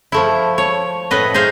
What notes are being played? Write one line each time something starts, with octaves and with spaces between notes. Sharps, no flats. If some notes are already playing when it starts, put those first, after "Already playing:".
F3 A3 E4
C#5
A2 A4 B4 D#5
D#4 G#4 C5 F5